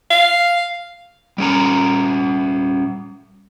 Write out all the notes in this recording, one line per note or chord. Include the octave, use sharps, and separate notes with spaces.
F5
G3 C#4 A#5